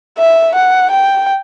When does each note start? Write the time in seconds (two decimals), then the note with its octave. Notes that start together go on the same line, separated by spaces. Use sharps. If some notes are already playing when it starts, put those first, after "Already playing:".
0.18 E5
0.55 F#5
0.91 G5